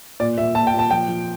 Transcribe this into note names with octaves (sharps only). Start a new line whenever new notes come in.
A#2 D5
A#2 E5
A#2 A5
G5
A#2
A5
F3 G5
F3